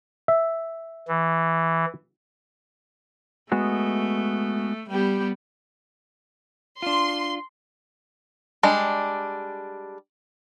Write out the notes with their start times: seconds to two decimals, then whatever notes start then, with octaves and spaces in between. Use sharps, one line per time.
0.28 E5
1.08 E3
3.52 G#3 A3 B3 F#4
4.89 G3 B3 G4
6.82 D4 F4 C6
8.63 G3 G#3 D4